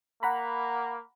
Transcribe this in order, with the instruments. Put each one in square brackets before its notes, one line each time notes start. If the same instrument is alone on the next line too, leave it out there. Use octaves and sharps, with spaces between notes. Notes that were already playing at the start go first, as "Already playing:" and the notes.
[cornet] A#3 [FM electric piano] F#5 A#5 B5